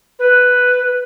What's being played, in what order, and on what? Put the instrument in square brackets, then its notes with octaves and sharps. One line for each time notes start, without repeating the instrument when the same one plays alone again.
[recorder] B4